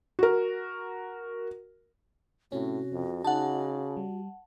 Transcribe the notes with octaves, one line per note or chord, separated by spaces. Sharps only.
F#4 A#4
A2 C3 C#4 F#4
F2
C#3 D#4 F#5 A5
G3